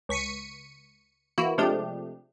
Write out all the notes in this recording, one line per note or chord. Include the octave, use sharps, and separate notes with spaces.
C#2 C#6 B6 C#7 D#7
E3 A#3 E4 F#4
C3 F3 G#3 A3 D4 G4